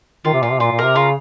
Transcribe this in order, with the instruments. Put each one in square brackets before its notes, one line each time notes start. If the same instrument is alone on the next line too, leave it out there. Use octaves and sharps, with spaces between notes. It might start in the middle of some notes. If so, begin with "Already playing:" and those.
[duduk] D#3 [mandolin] F4
[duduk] C3
[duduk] A#2 [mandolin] F4
[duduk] C3
[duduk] A#2 [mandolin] F4
[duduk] A#2
[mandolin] A#4
[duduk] C3
[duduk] C#3 [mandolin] F4